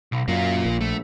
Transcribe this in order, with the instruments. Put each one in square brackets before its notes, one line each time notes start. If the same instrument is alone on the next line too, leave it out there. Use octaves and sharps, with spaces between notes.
[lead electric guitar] B1
[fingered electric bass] F#2 [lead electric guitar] A#3 F4
[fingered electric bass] A#1
[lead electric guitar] A3